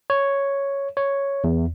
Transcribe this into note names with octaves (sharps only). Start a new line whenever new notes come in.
C#5
C#5
E2